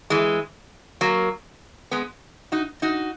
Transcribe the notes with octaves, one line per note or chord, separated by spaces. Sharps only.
E3 G#3
F#3 A#3
G#3 B3
D#4 F#4
D#4 F#4